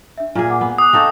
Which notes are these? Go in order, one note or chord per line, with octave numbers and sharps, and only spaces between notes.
D4 E5
A#2 A#3 G#4
F#5 D6
B3
D6 D#6 F#6
C4 D#4 A4 F5 C#6 G6